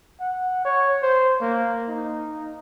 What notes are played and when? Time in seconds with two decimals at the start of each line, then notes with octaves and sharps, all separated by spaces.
0.21 F#5
0.65 C#5
1.03 C5
1.42 A#3
1.89 D#4